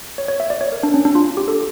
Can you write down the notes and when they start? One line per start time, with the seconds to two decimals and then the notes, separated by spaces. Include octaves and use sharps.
0.18 C#5
0.28 C#5
0.40 E5
0.50 D5
0.61 C#5
0.72 A#4
0.83 D4
0.94 C#4
1.05 D4
1.15 F4
1.37 G4
1.48 A4